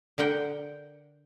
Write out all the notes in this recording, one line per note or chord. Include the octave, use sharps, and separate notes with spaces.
D3 A#4 F#5 G5